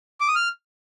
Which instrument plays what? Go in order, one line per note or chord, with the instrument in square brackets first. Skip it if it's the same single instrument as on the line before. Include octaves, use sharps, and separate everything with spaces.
[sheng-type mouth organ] D6
D#6
F6